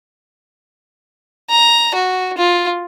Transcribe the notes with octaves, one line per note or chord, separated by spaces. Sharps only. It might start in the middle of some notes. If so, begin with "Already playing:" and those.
A#5
F#4
F4